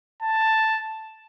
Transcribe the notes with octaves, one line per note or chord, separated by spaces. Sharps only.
A5